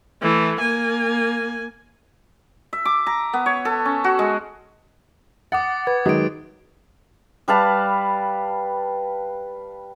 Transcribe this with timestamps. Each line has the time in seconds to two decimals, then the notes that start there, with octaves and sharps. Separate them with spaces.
0.22 E3 A3
0.61 A#3 G#5
2.73 E5
2.85 D6
3.07 A#5
3.33 B3
3.46 C#5
3.65 A4
3.85 C#4
4.04 F#4
4.19 G#3
5.52 F#5 D6 D#6 A6
5.87 B4 G#6
6.06 D#3 F#3 G#3 D#6 D7
7.48 G3 B4 F5 A5